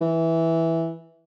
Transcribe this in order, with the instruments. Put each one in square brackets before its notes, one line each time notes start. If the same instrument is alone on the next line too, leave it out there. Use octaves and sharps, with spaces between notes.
[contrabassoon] E3